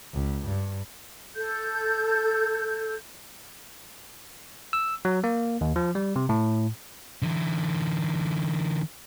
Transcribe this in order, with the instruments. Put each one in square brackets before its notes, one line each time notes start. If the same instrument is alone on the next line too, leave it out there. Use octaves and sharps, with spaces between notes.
[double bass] C#2
G2
[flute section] A4 G6
[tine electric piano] E6
F#3
A#3
D#2
F3
G3
C3
A2
[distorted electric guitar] D3 E3